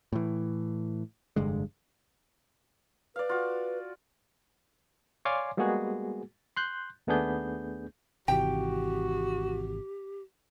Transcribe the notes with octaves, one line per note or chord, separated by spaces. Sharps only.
A2 E3
F1 G2 D3 G#3
B4 D5 F5
F4 F#4
C#5 D5 F5 G#5 C6 D6
G3 G#3 A#3 B3 F#4 G#4
C6 F#6 G6
D#2 A3 B3 D4 G#4 G6
G#1 C3 E3 F#4 G4 G5